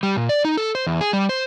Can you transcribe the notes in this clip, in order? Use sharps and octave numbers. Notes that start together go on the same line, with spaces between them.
G3
A#2
D5
D#4
A4
C5
E2
G#4
G3
C5